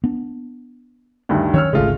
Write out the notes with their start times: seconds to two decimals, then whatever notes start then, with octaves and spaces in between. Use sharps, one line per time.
0.04 B3 D4
1.29 D2 G2 D#3
1.54 D#3 F#3 C#4 C#5 E6 F6
1.73 G#1 D2 C#3 G#3 A3 F4